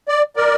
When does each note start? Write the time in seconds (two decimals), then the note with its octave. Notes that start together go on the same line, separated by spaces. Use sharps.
0.08 D5
0.36 A#4 D5